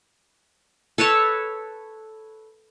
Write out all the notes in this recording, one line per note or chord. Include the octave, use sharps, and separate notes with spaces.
A4 B4 C#5 A5